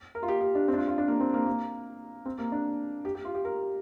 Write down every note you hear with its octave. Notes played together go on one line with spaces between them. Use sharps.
A#4
F4
G4
G4
D4
C4
D4
F4
F4
D4
A#3
C4
A#3
A#3
C4
A#3
D4
G4
G4
F4
G4
A#4